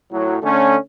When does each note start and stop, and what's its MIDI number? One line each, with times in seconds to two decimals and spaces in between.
0.11 0.37 45
0.11 0.37 54
0.42 0.76 50
0.42 0.76 57
0.42 0.76 61